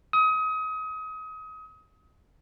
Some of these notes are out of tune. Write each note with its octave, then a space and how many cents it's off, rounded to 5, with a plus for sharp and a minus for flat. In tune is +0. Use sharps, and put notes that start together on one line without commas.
D#6 +30